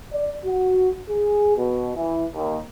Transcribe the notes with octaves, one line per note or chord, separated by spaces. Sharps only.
D5
F#4
G#4
B2
E3
D#2